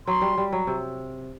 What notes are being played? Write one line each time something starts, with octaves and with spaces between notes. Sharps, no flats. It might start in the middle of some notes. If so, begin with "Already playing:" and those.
F#3 C6
G3
G3
F#3
C3